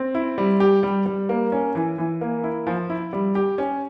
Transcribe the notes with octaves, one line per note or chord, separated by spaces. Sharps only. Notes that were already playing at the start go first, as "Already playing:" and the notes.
Already playing: C4
E4
G3
G4
G3
G3
A#3
C#4
E3
E3
A#3
E4
F3
E4
G3
G4
C#4